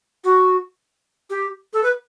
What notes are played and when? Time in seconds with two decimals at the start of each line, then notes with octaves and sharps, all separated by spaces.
0.24 F#4
1.30 G4
1.73 A4
1.83 B4